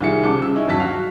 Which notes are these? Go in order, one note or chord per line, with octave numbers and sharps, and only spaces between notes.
C2 D#3 F4 G#4 E5 C#7
C2 C#3 C4 A5 D6 C#7
C#3 E6
C#4 D#4 E4
G1 D#2 F#3 A5 B6
F#4 F5